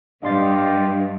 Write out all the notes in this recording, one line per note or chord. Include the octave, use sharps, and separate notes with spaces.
G2 D4 G4 D#5 F5 C6 A6